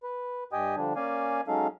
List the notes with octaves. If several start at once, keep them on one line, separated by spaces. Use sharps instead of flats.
B4
G2 G4 D#5 G5 G#5 D#6
D3 F3 G3 D4
A#3 C#4 D5 F5 G#5
F#3 G#3 C#4 D#4 A4 F5